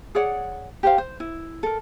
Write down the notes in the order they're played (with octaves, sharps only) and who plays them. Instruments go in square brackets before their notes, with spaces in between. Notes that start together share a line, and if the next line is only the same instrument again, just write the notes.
[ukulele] G#4 C#5 D5 F#5
G4 C5 F5
C5
E4
A4 A#4